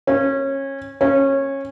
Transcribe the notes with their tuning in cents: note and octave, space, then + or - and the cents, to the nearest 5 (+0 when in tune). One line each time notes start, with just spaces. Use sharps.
C#4 -25
C#4 -20